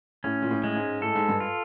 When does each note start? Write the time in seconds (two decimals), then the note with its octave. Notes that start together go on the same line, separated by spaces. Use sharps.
0.24 A2 C#4
0.42 A#2
0.51 A2
0.64 G#3
0.76 G#2
1.01 A2 A4
1.15 G#2
1.29 G2
1.40 F4